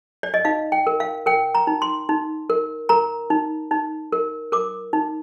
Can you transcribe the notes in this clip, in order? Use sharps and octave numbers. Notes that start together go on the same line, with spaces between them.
D5
D#5
D#4 F5
G5
A#4
F5
A#4 G5
A#5
D#4
C6
D#4
A#4
A#4 A#5
D#4
D#4
A#4
A#4 D6
D#4